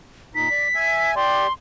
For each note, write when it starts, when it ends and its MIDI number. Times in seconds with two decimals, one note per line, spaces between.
0.35 0.49 46
0.35 0.49 63
0.35 1.11 95
0.51 0.68 74
0.75 1.14 76
0.75 1.14 80
1.16 1.47 67
1.16 1.47 74
1.16 1.52 84